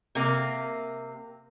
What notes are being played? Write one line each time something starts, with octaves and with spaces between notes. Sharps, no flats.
C3 A#3